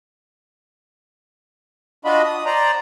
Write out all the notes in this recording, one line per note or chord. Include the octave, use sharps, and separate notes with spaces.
D4 F4 F#4 D#5 B5
D#6
C5 D5 A#5